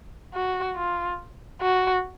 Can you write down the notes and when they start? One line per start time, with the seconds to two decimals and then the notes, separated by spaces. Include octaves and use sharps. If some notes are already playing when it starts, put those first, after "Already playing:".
0.34 F#4
0.76 F4
1.61 F#4